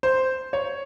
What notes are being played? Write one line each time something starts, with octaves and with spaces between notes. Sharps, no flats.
C5
C#5